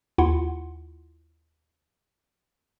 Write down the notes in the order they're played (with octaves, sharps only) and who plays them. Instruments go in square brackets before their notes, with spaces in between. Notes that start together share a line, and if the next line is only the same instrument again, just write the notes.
[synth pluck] D#2 E4 F4 F#5 C6